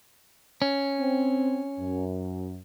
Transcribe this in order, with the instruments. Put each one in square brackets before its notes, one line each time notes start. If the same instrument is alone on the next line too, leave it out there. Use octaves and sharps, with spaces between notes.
[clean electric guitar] C#4
[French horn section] C4
F#2